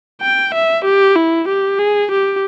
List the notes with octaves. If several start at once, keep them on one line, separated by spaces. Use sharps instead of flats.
G5
E5
G4
E4
G4
G#4
G4